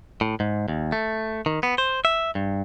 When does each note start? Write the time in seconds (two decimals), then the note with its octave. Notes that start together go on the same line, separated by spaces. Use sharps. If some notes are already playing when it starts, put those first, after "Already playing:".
0.21 A2
0.40 G#2
0.68 D#2
0.92 A3
1.46 D#3
1.63 B3
1.78 C5
2.05 E5
2.35 G2